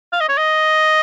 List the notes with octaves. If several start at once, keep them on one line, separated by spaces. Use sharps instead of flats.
F5
D#5
C#5
D#5